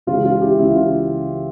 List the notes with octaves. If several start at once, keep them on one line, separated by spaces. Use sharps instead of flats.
C#2 C#3 E3 G#3 F4
F4
E4 G4
C#2 C#3 E3 G#3 E4
F4